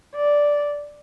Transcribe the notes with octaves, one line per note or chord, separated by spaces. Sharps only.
D5